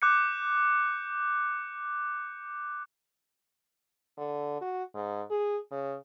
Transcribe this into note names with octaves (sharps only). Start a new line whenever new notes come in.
D6 F#6 G6 C#7
D3
F#4
G#2
G#4
C#3